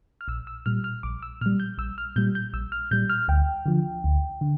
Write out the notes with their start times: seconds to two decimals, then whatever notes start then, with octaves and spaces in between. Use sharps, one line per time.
0.21 F6
0.28 A#1 E6
0.47 E6
0.66 A#2 G3 F6
0.84 F6
1.03 A#1 D6
1.22 E6
1.41 A#2 G3 F6
1.60 G6
1.78 A#1 E6
1.98 F6
2.16 A#2 G3 G6
2.35 G6
2.53 A#1 E6
2.72 F6
2.91 A#2 G3 G6
3.10 F6
3.28 D2 G5
3.66 D3 F3
4.04 D2
4.41 D3